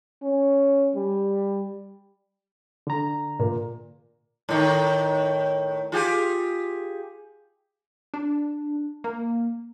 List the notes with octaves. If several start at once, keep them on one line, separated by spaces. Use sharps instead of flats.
C#4
G3
D3 A#5
A#2
A2 D#3
F4 G4 G#4
D4
A#3